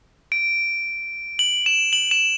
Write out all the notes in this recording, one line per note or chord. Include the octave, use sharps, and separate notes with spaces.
D7
F#7
E7
F#7
E7